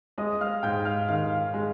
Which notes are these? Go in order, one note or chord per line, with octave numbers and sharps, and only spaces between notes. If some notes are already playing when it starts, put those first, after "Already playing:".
G#3 D#5 D#6
F5 F6
G#2 G5 G6
F5 F6
D#3 F5 F6
G#3